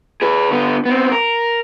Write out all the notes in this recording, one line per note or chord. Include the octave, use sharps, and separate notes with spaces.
G#4 B4
D3 B3
B3 C4
A#4